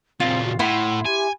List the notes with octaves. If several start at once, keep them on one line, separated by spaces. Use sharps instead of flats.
A#2 C#3 C4 F4
F#4
A2 E4 F#5 B5 C6
G4 G#5